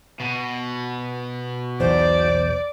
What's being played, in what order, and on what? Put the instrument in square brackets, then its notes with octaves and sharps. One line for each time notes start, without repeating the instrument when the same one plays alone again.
[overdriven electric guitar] B2
[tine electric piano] B1 E2 [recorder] C5 [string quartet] D5